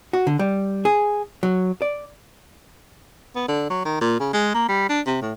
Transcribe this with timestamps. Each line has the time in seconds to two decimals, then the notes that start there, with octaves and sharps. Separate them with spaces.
0.13 F#4
0.27 D3
0.39 G3
0.85 G#4
1.43 F#3
1.82 D5
3.35 B3
3.48 D3
3.70 F#3
3.85 D#3
4.01 A#2
4.19 C#3
4.33 G#3
4.54 A#3
4.68 G3
4.89 D4
5.06 C3
5.21 A2